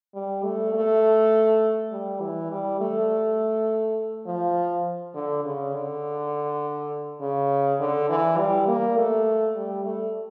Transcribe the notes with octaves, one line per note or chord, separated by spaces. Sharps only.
G3
A3
A3
G3
E3
G3
A3
F3
D3
C#3
D3
C#3
D3
E3
G3
A#3
A3
G3
A3